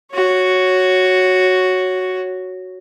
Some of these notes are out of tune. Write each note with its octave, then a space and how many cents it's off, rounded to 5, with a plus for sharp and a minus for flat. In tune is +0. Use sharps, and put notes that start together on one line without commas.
F#4 +0 C#5 +0